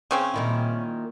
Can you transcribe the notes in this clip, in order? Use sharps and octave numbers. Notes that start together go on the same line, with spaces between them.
C#3 C4 C#4
A#2 D#3 E4